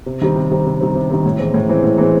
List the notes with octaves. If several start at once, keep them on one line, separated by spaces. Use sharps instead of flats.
C3
D#3 G3 C4
C3
D#3 G3 C4
C3
D#3 G3 C4
C3
D#3 G3 C4
A2
E3 G#3 C4
A2
E3 G#3 C4
A2
E3 G#3 C4